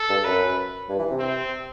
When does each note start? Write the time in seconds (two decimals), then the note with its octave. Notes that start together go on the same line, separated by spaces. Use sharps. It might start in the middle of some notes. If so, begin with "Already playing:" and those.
Already playing: A4
0.10 G2
0.25 F#2 B4
0.89 G2
0.99 E3
1.10 C3
1.20 C4